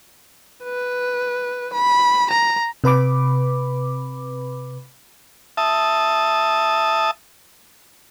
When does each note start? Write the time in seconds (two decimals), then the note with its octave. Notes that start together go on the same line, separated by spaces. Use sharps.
0.64 B4
1.74 B5
2.30 A#5
2.84 C3 B4 B5 D6
5.57 E5 A5 D#6